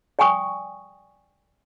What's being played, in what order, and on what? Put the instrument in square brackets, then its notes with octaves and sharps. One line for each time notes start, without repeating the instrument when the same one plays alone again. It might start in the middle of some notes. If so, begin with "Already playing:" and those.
[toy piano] D5 G5 G#5 C#6 D#6